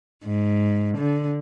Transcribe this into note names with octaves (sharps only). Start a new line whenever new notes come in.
G#2
D3